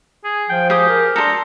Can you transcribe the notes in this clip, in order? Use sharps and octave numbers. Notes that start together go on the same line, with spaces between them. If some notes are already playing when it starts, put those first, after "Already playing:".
G#4
F3 G5
G4 G#4 D#6
A#4
D4 A4 A#5 C6